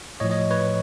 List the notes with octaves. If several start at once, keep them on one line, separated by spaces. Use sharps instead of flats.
A2 F3 C#5 D#5
C#5 D#5
B4 C#5